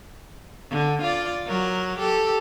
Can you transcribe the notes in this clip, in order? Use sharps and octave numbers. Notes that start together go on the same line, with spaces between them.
D3
F4 D5
F#3 A#4
G4 A4